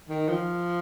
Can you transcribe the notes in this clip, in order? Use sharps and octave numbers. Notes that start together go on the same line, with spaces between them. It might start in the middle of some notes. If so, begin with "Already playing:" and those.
D#3
F3